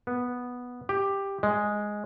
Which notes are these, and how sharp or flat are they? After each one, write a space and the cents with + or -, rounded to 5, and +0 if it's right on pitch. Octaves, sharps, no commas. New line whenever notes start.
B3 -5
G4 +10
G#3 +0